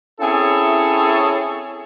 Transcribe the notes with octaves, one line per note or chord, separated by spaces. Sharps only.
C4 C#4 E4 G#4 A4 C#5